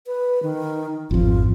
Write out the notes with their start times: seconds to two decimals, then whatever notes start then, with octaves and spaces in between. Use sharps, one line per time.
0.07 B4
0.43 D#3
1.11 G#1 F2 F4